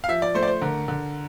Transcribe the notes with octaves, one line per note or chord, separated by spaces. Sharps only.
F5
F3 E5
D5
A3 C5
D5
C5
D3 A#4
D3